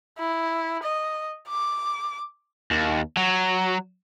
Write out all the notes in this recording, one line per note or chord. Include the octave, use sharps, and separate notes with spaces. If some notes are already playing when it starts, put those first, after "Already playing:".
E4
D#5
D6
D#2
F#3